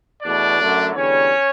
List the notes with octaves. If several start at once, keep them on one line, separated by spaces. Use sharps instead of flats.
E2 B2 A3 D4 D5
F#2 D3 F#3 A3
E2 D3 G3 C#4 C#5